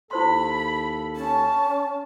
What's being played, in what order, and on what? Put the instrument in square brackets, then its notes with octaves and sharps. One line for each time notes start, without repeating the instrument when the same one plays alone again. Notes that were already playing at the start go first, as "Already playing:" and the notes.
[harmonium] D#2 A4 [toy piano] E4 C5 C6 [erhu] B5
[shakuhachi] C#4 [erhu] A5